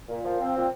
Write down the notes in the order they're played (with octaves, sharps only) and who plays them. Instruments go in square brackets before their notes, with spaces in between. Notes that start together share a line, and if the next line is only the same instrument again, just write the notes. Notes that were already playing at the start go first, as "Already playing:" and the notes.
[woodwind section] A#2
F3
C4
A#2